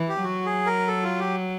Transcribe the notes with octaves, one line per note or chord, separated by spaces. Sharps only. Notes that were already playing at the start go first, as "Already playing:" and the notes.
Already playing: E3
G4
F#3 F#4
G#4
A#4
A4
F4
G4